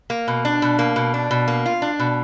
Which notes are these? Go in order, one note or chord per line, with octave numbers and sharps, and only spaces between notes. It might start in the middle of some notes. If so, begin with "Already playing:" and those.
A#3
B2
D4
B2
A#3
B2
D4
B2
A#3
F4
D4
B2